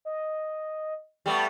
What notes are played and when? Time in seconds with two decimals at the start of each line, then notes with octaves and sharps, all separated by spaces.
0.05 D#5
1.26 G3 A3 B3 G5